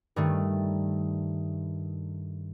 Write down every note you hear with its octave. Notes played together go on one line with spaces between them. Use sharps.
G2 D#3 A3